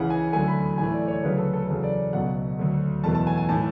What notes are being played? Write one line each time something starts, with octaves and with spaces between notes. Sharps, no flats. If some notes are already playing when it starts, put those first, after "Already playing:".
Already playing: C#2 C#3 E3 F#5
G#5
D2 D3 F#3 A3 G#5
B5
A2 E3 A3 G#5
D5
C#5
D2 C#3 F#3 A3 B4
A4
A4
E2 C#3 F#3 A4
D5
C#2 B2 F#3 A3 F#5
D2 D3 F#3 A3
E2 B2 F#3 A3 A5
A5
G#5
G#5
A2 E3 A3 A5